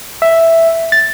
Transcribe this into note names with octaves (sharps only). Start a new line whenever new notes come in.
E5
A6